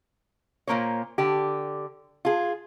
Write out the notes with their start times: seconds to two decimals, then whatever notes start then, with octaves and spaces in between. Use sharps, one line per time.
0.67 A#2 F#3 A#3 C5 C#5
1.18 D3 G4
2.25 F4 G#4